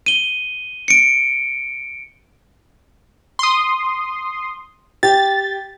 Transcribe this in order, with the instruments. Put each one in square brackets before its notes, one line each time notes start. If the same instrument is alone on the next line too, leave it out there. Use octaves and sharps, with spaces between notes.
[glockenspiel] D#7 G7
C#7 D7
[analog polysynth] C6 D#6
[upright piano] G4 [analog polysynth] A6